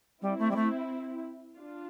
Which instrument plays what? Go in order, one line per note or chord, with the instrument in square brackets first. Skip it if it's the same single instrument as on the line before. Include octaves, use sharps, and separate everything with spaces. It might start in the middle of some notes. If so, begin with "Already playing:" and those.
[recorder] G3 [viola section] C4 E4
[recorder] A3
G3
A3
[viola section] D4 F4